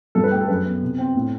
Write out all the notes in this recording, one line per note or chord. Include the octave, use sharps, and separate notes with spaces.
G2 A4
B4
A3 G4
A4
F#2 B4
B3
C3
C4
A2